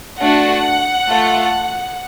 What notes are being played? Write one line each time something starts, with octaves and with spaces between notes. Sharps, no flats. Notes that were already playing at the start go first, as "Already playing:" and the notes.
A3 D4 F#4 F#5
A3 F4 A4